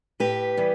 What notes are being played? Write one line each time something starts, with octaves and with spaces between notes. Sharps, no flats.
A2 G4 B4
E3 G3 B3